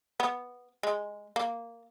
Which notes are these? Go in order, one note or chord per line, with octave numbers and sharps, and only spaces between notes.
B3
G#3
A#3